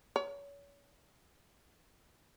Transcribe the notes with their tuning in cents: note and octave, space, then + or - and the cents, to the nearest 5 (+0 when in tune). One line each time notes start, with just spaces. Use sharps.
C#5 +35